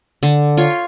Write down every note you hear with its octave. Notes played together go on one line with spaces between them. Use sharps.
D3
F4 C#5